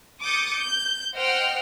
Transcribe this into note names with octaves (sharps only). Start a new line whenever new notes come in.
D6 D#6 G6 A6 C#7
G6
C5 D#5 F#5 G5 F6